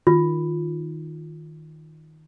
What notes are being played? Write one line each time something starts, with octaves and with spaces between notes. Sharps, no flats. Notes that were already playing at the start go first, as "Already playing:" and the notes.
D#3 F4